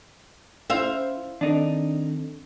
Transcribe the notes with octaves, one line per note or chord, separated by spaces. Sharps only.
C#4 E4 C5 E5 F5
D#3 C4 D4 D#4 A4